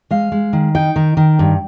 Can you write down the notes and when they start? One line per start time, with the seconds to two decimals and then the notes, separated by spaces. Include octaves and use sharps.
0.11 G#3 F5
0.32 G#3
0.53 D#3
0.75 D#4 G5
0.96 D#3
1.17 D#3
1.39 G2